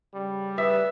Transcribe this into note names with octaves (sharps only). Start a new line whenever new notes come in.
C#3 G3
B4 E5